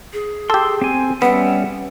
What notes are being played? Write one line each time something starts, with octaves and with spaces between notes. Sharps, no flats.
G#4
G4 A4 C6 E6
C4 G#5
G3 B3 C#4 E5 F#5